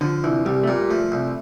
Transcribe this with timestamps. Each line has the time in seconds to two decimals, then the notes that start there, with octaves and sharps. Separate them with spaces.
0.01 D3 F3
0.24 C2 E3
0.46 C2 G3
0.63 A3
0.68 A#2 G3
0.90 F3 A3
1.12 C2